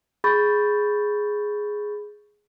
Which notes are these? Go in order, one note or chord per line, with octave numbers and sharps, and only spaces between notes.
G#4 B5 C#6 G6 A6